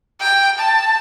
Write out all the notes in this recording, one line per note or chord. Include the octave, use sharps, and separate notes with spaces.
G5
A5